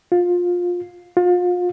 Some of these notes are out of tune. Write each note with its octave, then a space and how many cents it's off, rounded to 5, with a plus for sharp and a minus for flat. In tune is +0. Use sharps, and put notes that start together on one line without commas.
F4 +20
F4 +35